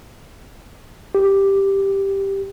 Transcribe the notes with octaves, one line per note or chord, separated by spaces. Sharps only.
G4